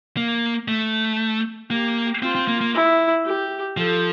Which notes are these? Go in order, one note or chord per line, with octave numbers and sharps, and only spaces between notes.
A#3
A3
A#3 G4
C4 F4
C4
A#3
A#3
E4
G4
F3 A4